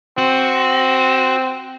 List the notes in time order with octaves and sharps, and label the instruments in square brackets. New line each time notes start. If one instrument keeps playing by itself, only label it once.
[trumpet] C4 [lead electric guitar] F#4